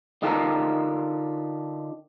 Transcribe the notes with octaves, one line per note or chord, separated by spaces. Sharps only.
D3 D#4 F4 G4 A4 A#4